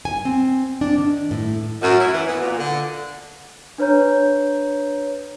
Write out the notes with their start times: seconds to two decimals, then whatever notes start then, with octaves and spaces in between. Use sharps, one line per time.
0.05 G#5
0.25 C4
0.81 D4
0.98 D#3
1.31 A2
1.82 F#2
2.01 E4
2.14 E3
2.28 B3
2.41 A#2
2.59 D3
3.78 D4 B4 C#5 A#5 G6